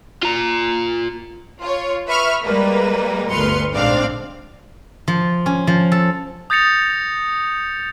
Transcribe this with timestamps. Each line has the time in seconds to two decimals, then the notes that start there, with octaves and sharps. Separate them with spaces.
0.23 F4 A#5
1.60 F4 C#5
2.07 B4 E5 B5 C#6 F6
2.44 G3 G#3 A#3 B4
3.30 G1 D2 B4 C6 F6 C#7
3.75 A#1 G#2 C4 D4 D5 F5
5.08 F3
5.46 C#4
5.67 F3
5.92 A4
6.50 D#6 G6 A6 A#6 C#7 F7